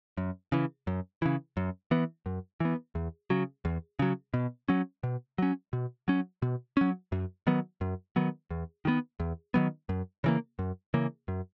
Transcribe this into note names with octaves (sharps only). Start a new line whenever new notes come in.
F#2
C#3 E3
F#2
C#3 E3
F#2
E3 B3
F#2
E3 B3
E2
C#3 F#3
E2
C#3 F#3
B2
F#3 C#4
B2
F#3 C#4
B2
F#3 C#4
B2
F#3 C#4
F#2
D#3 F#3 B3
F#2
D#3 F#3 B3
E2
D#3 F#3 B3
E2
D#3 F#3 B3
F#2
C#3 E3 A#3
F#2
C#3 E3 A#3
F#2